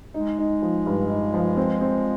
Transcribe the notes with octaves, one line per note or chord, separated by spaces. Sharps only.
G#3 D#4
D#4
F3
G2
D#4
F3
C4
C4